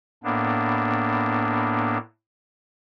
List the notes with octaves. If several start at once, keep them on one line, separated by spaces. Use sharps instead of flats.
A2 A#3 B3 D4